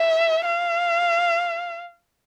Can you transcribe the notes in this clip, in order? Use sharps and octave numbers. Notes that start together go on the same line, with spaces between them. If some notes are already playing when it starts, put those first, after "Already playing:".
Already playing: E5
F5